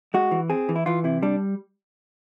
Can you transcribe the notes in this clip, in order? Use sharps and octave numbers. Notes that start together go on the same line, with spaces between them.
G#3 F#4
E3
C4 G#4
E3
E4
E3 F4
C3 E4
G3 D4